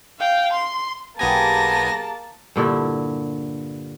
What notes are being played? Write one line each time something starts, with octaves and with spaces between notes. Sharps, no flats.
F5 G5
C6
B1 A#3 B3 G4 G#4 G#5 A5 A#6
G2 A#2 D3 E4